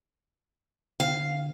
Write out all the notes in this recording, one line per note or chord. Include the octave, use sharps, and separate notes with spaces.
D3 F5